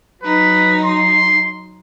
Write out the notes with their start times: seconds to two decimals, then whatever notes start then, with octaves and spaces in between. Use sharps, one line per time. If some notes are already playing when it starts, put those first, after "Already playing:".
0.23 F#3 D#4 B4
0.85 C6